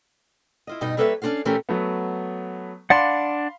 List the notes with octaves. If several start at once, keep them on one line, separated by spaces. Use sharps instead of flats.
E4 F4 D#5
G2 B2 D#4 D#5
G3 A#3 A4 B4 C#5 E5
C#4 D4 F#4 A4 F5
A#2 E3 A3 C#4 G4 A#4
F#3 A3 B3
D4 D5 F5 F#5 B5 C6